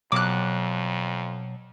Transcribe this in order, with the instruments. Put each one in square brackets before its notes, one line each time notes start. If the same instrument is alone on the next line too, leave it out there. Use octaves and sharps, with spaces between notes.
[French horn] F2 [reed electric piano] B2 [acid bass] F#3 [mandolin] D6 F#6